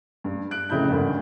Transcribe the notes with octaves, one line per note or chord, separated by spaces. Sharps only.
G2
F#6 D7
F1 A2 C#3 E4 B5 G6
G#1 D2 G2